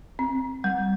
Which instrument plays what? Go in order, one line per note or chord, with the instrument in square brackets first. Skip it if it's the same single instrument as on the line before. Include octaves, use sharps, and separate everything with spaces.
[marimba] C4
G3